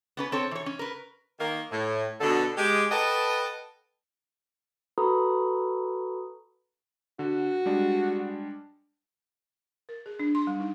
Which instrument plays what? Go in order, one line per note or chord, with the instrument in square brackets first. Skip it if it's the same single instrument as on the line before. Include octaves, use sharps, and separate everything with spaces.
[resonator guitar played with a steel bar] B3 C#4 B4
C4 A4 C#5
E3 C#5
C#4
A#4 B4
[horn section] D#3 A#3
A2
B2 D3 A4
G#3 G4
A4 B4 D#5 F#5 G5 A5
[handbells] F#4 A4 B4 A#5 B5 D#6
[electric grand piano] D3 [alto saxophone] F#4
[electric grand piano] G3 G#3 D4
[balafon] A#4
G#4
D4
C6
G3
D#4